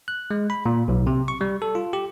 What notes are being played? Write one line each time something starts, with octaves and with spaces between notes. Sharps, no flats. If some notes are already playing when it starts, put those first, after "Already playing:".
F#6
G#3
B5
A#2
B1
C3
C#6
G3
A4
F4
G4